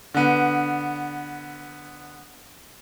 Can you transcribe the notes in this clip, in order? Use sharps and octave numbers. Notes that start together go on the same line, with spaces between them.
D3 B3